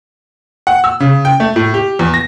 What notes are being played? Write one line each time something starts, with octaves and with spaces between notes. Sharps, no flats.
F#5
E6
C#3
G5
A3
A2
G4
E2
A#6